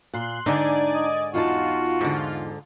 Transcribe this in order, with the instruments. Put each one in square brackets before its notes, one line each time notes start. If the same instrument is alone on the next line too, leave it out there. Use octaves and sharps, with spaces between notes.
[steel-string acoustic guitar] A#2 [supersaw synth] C6 F#6
[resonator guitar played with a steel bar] G#2 D3 [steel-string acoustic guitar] D4 D#4 [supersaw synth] D5 G#5
[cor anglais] D#5
[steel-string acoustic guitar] E2 D#4 A5 [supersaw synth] F4 [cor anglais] F#4
[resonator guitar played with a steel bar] G#2 D3